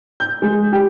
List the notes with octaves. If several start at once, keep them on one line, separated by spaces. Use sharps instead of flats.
G6
G#3
G4